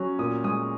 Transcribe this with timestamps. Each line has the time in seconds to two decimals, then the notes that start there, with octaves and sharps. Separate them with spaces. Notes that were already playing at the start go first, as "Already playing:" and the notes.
Already playing: F#3 C#4
0.19 A#2 D#6
0.44 G#3 D#6